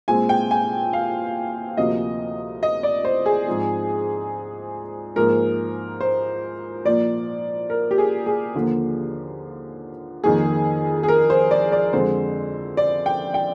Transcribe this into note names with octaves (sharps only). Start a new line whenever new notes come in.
A#2 G#3 C4 G#5
G5
G#5
F5
D2 C3 F3 A#3 D#5
D#5
D5
C5
G#4
G#2 F3 C4
G#2 F3 A#3 A#4
C5
A#2 F3 A#3 D5
A#4
G4
G#4
G#4
D#2 D3 F3 A#3
F2 D#3 A#3 G#4
G#4
A#4
C5
D5
D5
F2 D3 G#3 C4 C5
D5
G5
G5